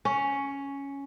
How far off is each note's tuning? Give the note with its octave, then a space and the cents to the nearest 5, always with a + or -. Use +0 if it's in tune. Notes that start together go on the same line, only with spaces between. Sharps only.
C#4 +5